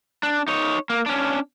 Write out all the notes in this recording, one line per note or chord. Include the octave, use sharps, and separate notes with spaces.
D4
D#4 C#5
A#3
C#4 D4